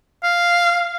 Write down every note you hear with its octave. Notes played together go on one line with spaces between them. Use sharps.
F5